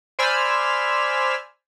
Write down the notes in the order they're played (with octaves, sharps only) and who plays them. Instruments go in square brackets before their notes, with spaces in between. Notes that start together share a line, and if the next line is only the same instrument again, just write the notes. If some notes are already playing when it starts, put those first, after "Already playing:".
[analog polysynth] C5 D5 G#5 B5 E6 F6